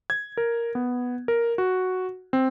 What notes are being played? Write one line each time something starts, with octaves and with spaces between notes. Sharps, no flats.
G#6
A#4
B3
A#4
F#4
C4